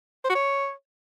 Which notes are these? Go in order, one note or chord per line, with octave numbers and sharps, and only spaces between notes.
C5
F#4
C#5